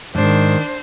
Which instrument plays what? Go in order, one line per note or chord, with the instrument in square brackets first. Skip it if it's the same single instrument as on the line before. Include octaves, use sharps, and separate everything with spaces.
[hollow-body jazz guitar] F2 G#2 [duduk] D#3 [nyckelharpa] D4 [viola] C5